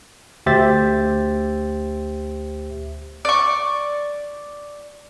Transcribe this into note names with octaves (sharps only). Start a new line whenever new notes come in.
D2 G4 C5 E5 A6
D5 C#6